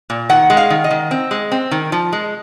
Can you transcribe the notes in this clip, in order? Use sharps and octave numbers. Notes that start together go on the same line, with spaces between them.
A#2
D#3 F#5
G#3
F5
D#3
D#5
D#3
C4
G#3
C4
D#3
F3
G#3